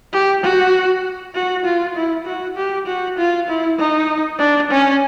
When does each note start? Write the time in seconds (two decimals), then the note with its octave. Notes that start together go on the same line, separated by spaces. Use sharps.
0.13 G4
0.43 F#4
1.34 F#4
1.65 F4
1.95 E4
2.26 F#4
2.56 G4
2.86 F#4
3.18 F4
3.48 E4
3.79 D#4
4.39 D4
4.70 C#4